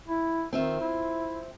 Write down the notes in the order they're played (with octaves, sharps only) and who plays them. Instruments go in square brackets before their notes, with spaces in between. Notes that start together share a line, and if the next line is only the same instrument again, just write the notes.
[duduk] E4
[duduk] D#3 [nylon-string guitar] C4 F4 E5
[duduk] E4